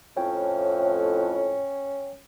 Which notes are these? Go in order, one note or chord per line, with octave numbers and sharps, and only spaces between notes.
F2 A2 C#4 C#5 G5